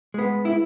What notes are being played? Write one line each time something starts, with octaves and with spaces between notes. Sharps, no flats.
G#3 B3
E4